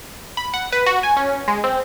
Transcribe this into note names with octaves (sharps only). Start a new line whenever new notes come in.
B5
F#5
B4
F#4
G#5
C#4
G#3
C4